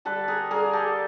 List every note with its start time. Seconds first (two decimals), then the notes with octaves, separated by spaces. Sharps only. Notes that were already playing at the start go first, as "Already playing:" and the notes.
0.05 D3 G3 A4 B4
0.28 G#4 A#4
0.51 D3 G3 G#4 A#4
0.73 G4 A4